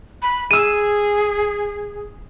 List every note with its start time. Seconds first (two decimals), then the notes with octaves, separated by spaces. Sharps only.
0.22 B5
0.51 G#4 E6 D#7